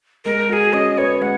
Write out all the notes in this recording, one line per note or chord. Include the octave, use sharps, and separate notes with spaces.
G#3 A#4
F#4 G#4 A#4
C#4 D#5
B4 C#5
G#3 F#5